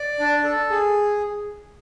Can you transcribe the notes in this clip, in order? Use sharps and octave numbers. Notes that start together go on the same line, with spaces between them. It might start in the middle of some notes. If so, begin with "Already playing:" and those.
Already playing: D5
D4
A4
G#4